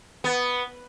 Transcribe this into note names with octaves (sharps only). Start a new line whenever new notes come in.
B3